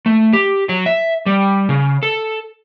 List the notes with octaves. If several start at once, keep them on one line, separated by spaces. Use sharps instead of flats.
A3
G4
F#3
E5
G3
C#3
A4